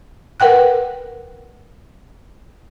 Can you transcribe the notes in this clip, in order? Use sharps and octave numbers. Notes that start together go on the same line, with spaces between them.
A#4 B4 F#5 G5 F#6